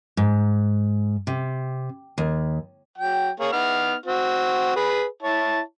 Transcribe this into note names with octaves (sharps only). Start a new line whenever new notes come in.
G#2
C3
D#2
F#3 G5
A#3 G#4 C#5
B3 D#4 F6
C4 F#4
G#4 B4
E4 C#5 A5